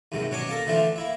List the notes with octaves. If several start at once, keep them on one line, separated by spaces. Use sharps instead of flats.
D#2 G#2 C3 F#3
B2 F#3 C#4 D4 C#5 D6
A#3 A4 A#4
D3 E3 F3 A3 D4 F4
A#3 E4 E5